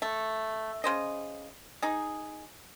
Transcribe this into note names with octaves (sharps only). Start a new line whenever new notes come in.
A3
C#3 C5 D#5
D#4 G#4